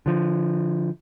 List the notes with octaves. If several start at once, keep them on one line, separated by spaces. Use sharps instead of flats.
D3 F3